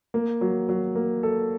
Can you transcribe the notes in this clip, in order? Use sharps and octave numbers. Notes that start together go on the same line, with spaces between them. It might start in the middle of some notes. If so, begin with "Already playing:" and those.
A#3
F#3
F#3
A#3
A4